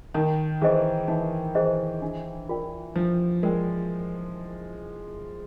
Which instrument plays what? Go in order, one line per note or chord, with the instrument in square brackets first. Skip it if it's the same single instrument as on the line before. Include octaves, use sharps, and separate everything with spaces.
[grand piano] D#3 [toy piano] D#4
[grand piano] E3 [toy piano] G#4 C5 D#5
[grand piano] E3 [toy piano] D#4
[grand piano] E3 [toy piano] G#4 C5 D#5
[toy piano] D4
F4 A#4 D5 G5
[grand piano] F3 [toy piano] D4
[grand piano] G#3 [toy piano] F4 A#4 D5 G5